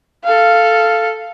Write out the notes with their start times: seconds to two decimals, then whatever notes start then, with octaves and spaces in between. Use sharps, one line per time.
0.24 A4 F5